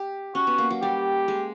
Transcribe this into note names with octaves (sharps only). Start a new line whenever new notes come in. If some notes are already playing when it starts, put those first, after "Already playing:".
Already playing: G4
C#4 F#4
B3
A#3
F#3
G3 G4
G#3